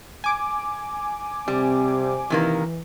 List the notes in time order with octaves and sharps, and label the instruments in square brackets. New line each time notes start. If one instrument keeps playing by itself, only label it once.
[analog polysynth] G#5 D6
[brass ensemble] C3 C4 [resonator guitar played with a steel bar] G3
[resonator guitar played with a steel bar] C3 D#3 A#3 [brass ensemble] E3